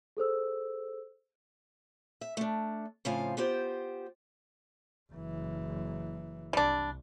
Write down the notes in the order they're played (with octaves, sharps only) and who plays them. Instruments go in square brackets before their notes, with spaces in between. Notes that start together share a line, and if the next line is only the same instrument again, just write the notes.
[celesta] G#4 A4 C5 E6
[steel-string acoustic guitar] E5
A3 D4
A2 C#3 F3 C4 F5 G#5
B3 F4 G4 C5
[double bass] F#1 E3
[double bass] C2 [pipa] G3 D4